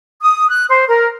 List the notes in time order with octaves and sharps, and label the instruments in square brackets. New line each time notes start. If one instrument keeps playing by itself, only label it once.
[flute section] D#6
F#6
C5
A#4